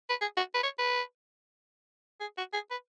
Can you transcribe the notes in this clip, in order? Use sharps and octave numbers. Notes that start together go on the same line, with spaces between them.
B4
G#4
F#4
B4
C#5
B4
G#4
F#4
G#4
B4